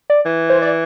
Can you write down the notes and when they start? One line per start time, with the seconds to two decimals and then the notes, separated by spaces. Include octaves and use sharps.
0.10 D5
0.25 E3
0.50 C5
0.62 D5